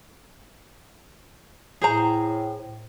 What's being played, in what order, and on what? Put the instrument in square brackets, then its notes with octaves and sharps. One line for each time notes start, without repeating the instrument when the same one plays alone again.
[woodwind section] A2 [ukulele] G#4 C5 A#5